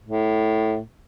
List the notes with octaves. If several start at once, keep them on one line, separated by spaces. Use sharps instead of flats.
A2